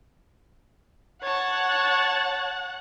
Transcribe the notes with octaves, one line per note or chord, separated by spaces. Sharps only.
C#5 F#5 A5